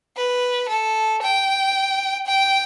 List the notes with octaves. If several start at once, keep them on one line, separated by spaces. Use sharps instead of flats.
B4
A4
G5
G5